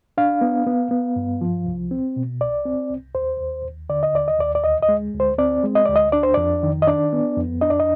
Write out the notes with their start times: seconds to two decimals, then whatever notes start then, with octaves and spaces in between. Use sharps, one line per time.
0.18 D4 F5
0.41 B3
0.66 B3
0.91 B3
1.16 G2
1.41 F3
1.66 C2
1.91 C4
2.16 B2
2.41 C2 D5
2.65 C4
2.90 C2
3.15 D#2 C5
3.40 D#2
3.65 D#2
3.89 D3 D5
4.03 D#5
4.14 D#2 D5
4.28 D#5
4.39 D#2 D5
4.55 D5
4.64 D2 D#5
4.82 D#5
4.89 G#3
5.14 D2
5.20 C5
5.38 C4 D5
5.64 G#3
5.75 D#5
5.85 D2 D5
5.96 D#5
6.12 D4 D5
6.23 C5
6.34 F2 D5
6.63 D#3
6.82 D#5
6.87 D4 D5
7.13 B3
7.37 F2
7.61 D4 D#5
7.70 D5
7.79 D#5